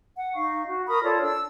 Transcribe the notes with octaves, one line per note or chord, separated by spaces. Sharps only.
F#5
D#4 F5 C#6
F#4
A#4 B5 C#6 D#6
F4 A4 C#5 D5
D4 E6